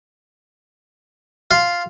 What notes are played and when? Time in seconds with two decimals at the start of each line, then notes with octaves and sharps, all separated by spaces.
1.51 F4